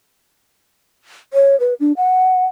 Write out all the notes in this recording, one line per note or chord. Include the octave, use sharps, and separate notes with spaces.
C#5
B4
D4
F#5